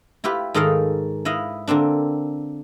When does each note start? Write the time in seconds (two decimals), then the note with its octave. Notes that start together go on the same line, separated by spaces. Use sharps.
0.24 E4 F4 G4 B4
0.54 G#2 D#3 D#4 A4 A#4 F5
1.25 E4 B4 D#5 F5
1.68 D3 A#3 C4 D4